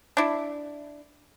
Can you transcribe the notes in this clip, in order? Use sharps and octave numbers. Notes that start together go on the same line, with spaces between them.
D4 E4